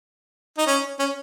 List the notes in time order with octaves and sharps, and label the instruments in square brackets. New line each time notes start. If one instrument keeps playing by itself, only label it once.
[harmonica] D#4
C#4
C#4